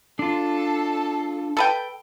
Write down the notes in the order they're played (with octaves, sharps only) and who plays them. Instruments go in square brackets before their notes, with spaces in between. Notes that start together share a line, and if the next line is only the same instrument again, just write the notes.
[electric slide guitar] D4 F4 [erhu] A4
[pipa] A4 B4 G5